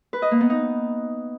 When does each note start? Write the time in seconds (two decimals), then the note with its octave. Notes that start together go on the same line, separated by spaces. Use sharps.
0.13 B4
0.22 D#5
0.31 A#3
0.41 B3
0.50 D#4